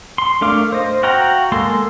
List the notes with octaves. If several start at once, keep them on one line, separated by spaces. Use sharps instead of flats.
C6
A3 D4 A#4 F5 D6
C5 D#5
F#4 F5 G5 A#5
G#3 A#3 A4 C6